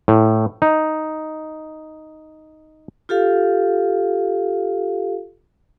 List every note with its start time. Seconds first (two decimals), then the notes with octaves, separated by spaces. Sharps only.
0.08 A2
0.62 D#4
3.09 F4 G4 A4 F5